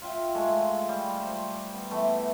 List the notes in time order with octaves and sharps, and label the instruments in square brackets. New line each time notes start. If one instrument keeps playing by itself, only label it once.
[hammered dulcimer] F4 E5 G5
G#3 A3
G3
C5
B3
E3 A3 B3